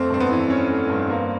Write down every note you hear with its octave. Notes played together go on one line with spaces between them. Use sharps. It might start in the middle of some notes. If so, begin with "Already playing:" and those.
Already playing: F2 A3 C4
G2 C4
B3
E3
C#4
A3
G2
A#3